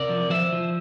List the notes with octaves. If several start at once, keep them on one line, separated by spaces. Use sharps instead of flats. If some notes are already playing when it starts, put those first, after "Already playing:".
Already playing: C3 A#4 D5
F3
F3 C5 E5
F3